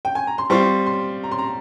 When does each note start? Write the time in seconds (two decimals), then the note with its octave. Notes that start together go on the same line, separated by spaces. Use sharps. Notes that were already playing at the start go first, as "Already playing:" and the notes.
0.05 G5
0.15 G#5
0.27 A#5
0.38 C6
0.50 G3 C4 F4 C#6
0.86 C6
1.24 A#5
1.31 C6
1.38 A#5